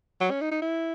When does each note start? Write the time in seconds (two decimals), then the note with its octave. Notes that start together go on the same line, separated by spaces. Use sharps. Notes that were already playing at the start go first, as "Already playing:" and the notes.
0.20 F#3
0.31 C#4
0.41 D#4
0.52 D#4
0.62 E4